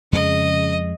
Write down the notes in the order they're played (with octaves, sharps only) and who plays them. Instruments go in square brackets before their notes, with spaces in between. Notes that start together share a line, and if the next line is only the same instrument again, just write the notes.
[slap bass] F2 G#3 [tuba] C#3 [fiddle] D#5